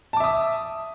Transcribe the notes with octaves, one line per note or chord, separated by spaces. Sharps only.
E5 A5 D6 D#6